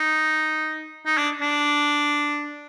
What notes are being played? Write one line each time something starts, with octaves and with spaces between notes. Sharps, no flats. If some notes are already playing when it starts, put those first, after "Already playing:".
Already playing: D#4
D#4
D4
D4